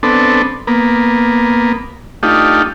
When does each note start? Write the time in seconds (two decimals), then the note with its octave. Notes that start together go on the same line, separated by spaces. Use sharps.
0.03 B3 C4 D4 A4
0.67 A#3 B3
2.23 A3 D4 D#4 F4 G4